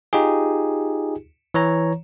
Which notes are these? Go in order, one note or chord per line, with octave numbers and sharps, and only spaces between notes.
D#4 F4 G4 G#4
E3 C#5 A#5